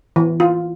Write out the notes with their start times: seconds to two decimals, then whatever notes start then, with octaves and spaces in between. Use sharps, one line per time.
0.16 E3
0.40 F4